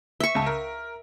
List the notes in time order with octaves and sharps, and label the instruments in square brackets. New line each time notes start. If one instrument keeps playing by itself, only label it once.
[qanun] E5 C#6
[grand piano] C#2 A5
A#4